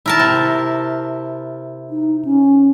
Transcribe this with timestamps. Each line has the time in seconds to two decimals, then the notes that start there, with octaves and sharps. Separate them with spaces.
0.06 E4 A#4 A5
0.19 C3
1.90 D#4
2.25 C#4